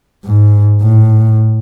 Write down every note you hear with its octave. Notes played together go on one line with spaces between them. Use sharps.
G#2
A2